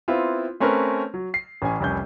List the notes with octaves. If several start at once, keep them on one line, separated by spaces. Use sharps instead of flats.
B3 C4 E4 F4
A3 C4 C#4 A#4 B4
F#3
C7
A1 C#4 G#5
F1 C2 C#4 G6